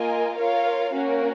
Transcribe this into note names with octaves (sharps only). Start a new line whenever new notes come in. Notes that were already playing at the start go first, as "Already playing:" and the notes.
Already playing: A#3 F4 A#4 D#5 G#5
F4 A#4 C#5 F5
A#3 C#4 F#4 A#4